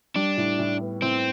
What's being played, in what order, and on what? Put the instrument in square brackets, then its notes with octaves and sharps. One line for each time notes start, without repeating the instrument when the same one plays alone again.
[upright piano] G3 [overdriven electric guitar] D4
[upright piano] A2
A2
B3
[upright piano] A2 [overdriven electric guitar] C4